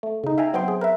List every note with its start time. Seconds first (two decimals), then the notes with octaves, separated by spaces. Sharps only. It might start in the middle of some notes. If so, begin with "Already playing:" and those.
0.03 A3
0.24 C#3 D#4
0.38 E5 F5 G5 G#5 A#5
0.53 F#3 B3 C4 G5 C6
0.68 G#4
0.81 A#4 B4 E5